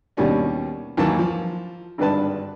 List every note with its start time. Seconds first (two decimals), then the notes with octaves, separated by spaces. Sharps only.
0.17 D#2 B2 G3 C#4 D4
0.97 D#2 E3 F#3 A#3 A5
1.19 F3
1.98 G#1 G2 D3 B4 A5